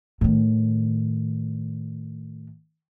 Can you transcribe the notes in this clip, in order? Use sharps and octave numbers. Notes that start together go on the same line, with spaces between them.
A2 D#3